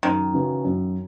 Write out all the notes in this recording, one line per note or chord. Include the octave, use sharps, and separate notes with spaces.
F#2 D#3
C#3 E3 B3 F#4
F#2